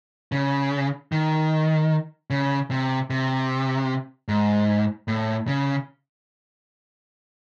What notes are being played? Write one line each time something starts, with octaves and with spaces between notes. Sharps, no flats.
C#3
D#3
C#3
C3
C3
G#2
A2
C#3